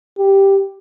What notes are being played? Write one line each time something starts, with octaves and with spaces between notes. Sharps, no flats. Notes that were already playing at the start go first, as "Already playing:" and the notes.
G4